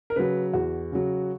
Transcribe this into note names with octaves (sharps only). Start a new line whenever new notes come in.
A#4
C#3 F#3 B4
E2 F#4
C#3 F#3